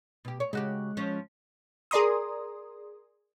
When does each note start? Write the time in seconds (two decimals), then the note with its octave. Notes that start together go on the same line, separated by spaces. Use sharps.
0.25 B2 G4
0.40 C#5
0.53 C#3 G#3 F#4 G4 F#6
0.97 F3 C#4
1.91 G#4 A#4 D5 A#5 C6 D#6